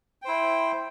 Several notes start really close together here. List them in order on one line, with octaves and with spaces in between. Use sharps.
G5 C5 E4